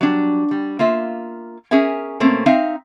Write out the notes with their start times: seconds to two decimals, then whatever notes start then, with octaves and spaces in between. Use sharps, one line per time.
0.01 F#3 G3 D4
0.51 G3
0.79 A#3 F4 E5
1.71 C#4 G#4 A#4 E5 G#5
2.20 B2 A3 A#3 C4 C#4
2.46 C4 D#4 E5 F5